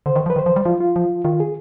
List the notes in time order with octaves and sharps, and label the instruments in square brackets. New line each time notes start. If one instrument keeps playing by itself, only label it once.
[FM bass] D3 [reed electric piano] C5
[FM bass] D#3
[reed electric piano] C5
[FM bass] F3
[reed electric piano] B4
[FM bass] D#3 [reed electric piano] C5
[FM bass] F3
G3
[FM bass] F3 [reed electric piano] F4
[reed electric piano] F4
[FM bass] F3
[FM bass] D#3 [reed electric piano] F4
[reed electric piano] G#4